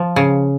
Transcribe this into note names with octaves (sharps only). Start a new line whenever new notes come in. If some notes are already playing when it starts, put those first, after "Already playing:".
Already playing: F3
C#3